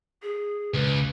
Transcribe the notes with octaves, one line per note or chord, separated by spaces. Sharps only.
G#4
C#2 B4